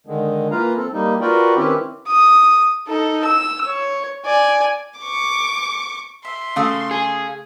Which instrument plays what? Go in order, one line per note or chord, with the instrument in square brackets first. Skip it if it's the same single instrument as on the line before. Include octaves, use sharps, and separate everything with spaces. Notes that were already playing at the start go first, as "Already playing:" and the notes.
[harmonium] D3 D#3 G#3
E3 A#3 F4 B4 F5 A#5
C4 A4
G3 A#3 D#4
F4 F#4 A#4 B4 D5 G5
D#3 C4 C#4 E4 G4 B4
[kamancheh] D#6
D#4 A4
E6
C#5
D5 G#5
[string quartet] C#6 D6
[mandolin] E5 [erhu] C6
[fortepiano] C#3 A3 [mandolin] F5 D#6 E6
[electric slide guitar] G#4